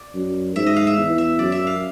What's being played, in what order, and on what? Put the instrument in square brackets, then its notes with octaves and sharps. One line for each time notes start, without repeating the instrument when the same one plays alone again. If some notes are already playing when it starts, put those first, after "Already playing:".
Already playing: [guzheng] D5
[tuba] F#2
[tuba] G#2 [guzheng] E5
[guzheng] D#5
F5
E5
[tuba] E2
[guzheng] E5
[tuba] F#2 [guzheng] D5
[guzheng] E5
F5